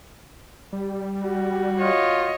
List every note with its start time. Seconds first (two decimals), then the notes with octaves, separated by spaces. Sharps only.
0.73 G3
1.25 F#4
1.79 F4 C#5 D#5